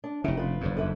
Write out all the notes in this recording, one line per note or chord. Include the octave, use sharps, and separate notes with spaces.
D4
F1 C#3 D#4 E4 G4
F4 B4
F#1 F2 G#2
D3 B4 E5